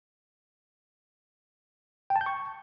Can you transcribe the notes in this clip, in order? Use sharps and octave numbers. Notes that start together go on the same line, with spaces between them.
G5
A5
G6
C#6